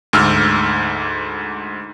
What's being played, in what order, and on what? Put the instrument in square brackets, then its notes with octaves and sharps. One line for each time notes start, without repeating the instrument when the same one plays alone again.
[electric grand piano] D2 G#2 E6 F6